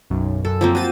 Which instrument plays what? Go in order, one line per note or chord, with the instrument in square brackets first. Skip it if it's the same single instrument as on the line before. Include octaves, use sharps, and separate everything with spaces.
[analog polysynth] B1 F#2
[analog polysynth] F#2 [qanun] A4
[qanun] F3 A#3 C4
[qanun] F#4 C5 [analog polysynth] A6 D#7